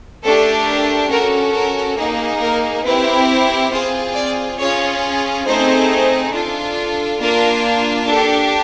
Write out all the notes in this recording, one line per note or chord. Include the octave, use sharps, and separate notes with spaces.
A3 D4 G4 A4
A#4
C#4 F#4 A4 A#4
A#4
A#3 D#4 G#4
A#4
C4 E4 G4 B4
C4 F4 G#4 C5
D5
C#4 F4 G#4 C#5
A3 C4 D#4 G#4 C5
D4 F4 A4
A#3 D4 F4 A#4
D4 G4 A4